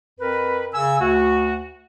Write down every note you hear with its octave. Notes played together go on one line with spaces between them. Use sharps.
F2 A#4 B4
C#3 G#5 E6
D2 F#4